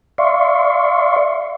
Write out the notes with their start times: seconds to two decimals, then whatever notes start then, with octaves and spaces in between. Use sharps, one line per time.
0.18 D5 E5 F5 C6 C#6